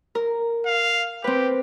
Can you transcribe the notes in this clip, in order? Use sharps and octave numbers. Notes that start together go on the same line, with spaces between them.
A#4
F5
C4 G4 B4